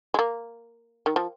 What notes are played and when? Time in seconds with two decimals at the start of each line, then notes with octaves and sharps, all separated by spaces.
0.14 G#3
0.19 A#3
1.06 D#3
1.16 F3